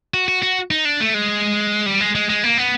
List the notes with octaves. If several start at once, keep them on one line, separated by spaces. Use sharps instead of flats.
F#4
F#4
F#4
D#4
D4
A3
G#3
G3
G#3
G#3
G#3
A#3
B3